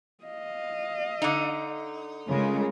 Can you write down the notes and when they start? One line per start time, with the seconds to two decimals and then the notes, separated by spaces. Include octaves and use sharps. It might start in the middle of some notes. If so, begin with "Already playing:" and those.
0.24 D#5 F5
1.22 D3 D#4
2.29 C#3 G#3 F4 A#4